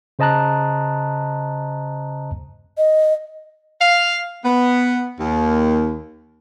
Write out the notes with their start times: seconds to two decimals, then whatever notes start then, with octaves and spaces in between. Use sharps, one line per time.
0.19 C#3 C5 D#5 A5 A#5 F#6
2.78 D#5
3.81 F5
4.43 B3
5.18 D#2